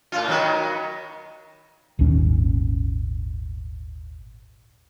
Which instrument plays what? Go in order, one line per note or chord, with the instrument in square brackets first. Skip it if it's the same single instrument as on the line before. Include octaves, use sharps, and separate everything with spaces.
[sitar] A2 F4
D#3 F#3 B3
[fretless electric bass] D#1 G#1 D#2 C#4